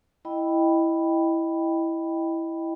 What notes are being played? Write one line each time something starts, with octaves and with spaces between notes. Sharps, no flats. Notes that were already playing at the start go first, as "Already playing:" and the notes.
E4 D#5 G5 B5